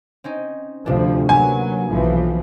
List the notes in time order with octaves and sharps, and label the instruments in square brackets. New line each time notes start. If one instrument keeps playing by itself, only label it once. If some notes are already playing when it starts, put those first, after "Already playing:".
[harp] C4 C#4 D#4
[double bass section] D2 F3 [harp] C3 D4
[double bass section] F#3 [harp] A#3 B3 [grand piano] G#5
[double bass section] B1 E3 F3